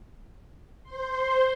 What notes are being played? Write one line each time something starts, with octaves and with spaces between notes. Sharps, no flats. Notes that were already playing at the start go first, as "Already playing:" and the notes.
C5 C6